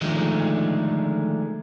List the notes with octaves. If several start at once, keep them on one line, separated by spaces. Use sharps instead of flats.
D3 D#3 F3 G#3 A3